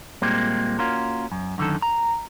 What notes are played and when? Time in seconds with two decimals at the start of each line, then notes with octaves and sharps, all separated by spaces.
0.22 A#2 G3 G#3 A#3 C4
0.79 A#3 C#4 F4 F#4 A#4
1.32 F#2
1.58 F#2 D3 D#3 A4
1.82 A#5